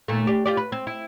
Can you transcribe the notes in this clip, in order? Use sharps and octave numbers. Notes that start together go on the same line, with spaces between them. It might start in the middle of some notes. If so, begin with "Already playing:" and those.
D#2 A#2 A3
D4 G4
F4 G4 D5
B4
C4
E4